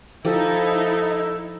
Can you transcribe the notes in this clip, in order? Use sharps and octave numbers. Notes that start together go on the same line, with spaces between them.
F3 D#4 E4 G4 A4